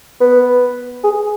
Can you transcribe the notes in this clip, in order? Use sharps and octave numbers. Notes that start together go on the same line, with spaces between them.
B3
G#4